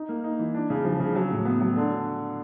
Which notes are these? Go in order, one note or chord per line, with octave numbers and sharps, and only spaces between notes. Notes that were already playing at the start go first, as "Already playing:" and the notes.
Already playing: D#4
A#3
D#4
E3
D4
C#3
F3
C#3
F#3
A2
B3
F#3
D3